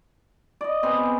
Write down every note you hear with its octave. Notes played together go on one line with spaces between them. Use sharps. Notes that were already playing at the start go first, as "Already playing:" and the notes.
D5 D#5
B3 C4 G#4